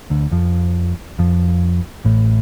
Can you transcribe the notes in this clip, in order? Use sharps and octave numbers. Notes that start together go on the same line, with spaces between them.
D2 D3
F2 F3
F2 F3
A1 A2